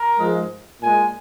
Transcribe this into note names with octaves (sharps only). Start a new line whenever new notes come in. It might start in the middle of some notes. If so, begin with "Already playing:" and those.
Already playing: A#4
G#2 F3 G#3
A#2 G#3 G#5